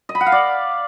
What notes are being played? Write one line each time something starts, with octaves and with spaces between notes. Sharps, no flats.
D#5
B5
F#5
F5
D5